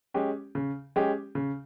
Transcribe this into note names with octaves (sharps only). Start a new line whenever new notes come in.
G#3 C#4 G4
C#3
G#3 C#4 G4
C#3